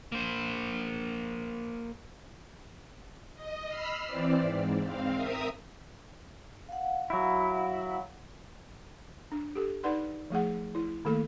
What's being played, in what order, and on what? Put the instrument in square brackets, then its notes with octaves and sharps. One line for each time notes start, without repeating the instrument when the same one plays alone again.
[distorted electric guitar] A#3 C5
[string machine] D#5
B5 E6 F6 C7
E3 C4 D5
G#2
C4 F5
A#4 E5 D#6
[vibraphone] F5 F#5
[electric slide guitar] F#3 E4
[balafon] D4
G4 A4
D#4 B4 D5 F#5 C6
F3 A3 G#4 F#5
E4
D#3 A3 A#3 A4 F5